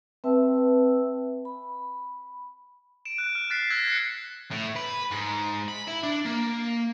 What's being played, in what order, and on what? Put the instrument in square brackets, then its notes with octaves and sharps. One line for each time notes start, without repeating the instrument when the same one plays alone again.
[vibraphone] C4 B4 E5 G5 A5 E6
B5
[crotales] D7 E7
F#6
F6
F6 F#6 A6 B6 C7
E6 F#6 G#6 A#6
F#6 C7 C#7
[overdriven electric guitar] A2
B4
G#2
B5
E4
D4
A#3